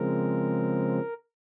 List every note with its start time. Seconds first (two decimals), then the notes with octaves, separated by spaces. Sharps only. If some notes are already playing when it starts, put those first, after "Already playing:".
Already playing: C#3 F3 G#3 C4 A#4